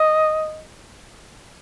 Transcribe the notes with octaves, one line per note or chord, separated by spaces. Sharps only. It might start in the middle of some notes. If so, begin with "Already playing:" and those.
Already playing: D#5